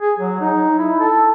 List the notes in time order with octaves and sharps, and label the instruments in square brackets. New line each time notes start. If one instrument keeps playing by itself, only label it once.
[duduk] G#4
F#3
D#4
E4
A4